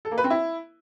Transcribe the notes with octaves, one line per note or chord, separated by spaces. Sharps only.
A4
A#3
B4
C4
E4